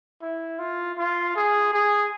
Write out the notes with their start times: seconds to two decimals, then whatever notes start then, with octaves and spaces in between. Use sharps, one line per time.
0.22 E4
0.59 F4
0.98 F4
1.36 G#4
1.73 G#4